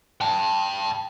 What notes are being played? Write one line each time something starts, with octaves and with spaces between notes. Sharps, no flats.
G5 A5